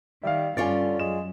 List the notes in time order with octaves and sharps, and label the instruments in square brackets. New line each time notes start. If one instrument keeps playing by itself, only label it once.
[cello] D#3 [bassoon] G3 [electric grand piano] E5 F5
[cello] G2 C#4 [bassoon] D3 [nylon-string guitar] F4 C#5 D5 [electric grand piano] G#5 A6
[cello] F#2 [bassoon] G#3 [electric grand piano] E7